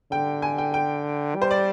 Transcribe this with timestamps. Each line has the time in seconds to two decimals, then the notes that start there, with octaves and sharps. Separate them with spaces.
0.12 D3 G5
0.42 G#5
0.58 G5
0.74 G5
1.36 G3
1.42 C5
1.51 D5